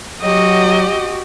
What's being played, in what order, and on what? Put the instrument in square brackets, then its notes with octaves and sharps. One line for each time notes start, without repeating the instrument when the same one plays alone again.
[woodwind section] F#3 [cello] F#4 [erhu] G4 [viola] D#5